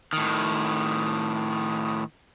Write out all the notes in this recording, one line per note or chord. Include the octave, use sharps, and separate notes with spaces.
A2 D#3